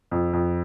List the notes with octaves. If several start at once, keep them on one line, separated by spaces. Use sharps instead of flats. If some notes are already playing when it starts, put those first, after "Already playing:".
F2
F2